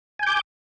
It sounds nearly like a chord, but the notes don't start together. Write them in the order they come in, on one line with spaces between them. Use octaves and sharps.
G#5 G6 D6